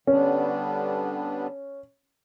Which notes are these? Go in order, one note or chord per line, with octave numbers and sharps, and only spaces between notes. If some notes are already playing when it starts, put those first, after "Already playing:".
D3 G3 B3 C#4 D4